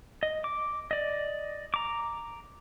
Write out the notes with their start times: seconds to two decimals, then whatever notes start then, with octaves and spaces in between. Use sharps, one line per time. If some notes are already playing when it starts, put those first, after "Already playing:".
0.23 D#5
0.44 D6
0.91 D5 D#5
1.74 A#5 D6